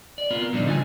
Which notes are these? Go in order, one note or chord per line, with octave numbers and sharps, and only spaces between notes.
D5
B3 F4 A#4
A#2 D3 F3 G3 D4 D#4
C#3 F4 D5 G#5